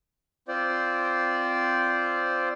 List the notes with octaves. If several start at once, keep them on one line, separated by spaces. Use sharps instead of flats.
C4 F4 C5 D5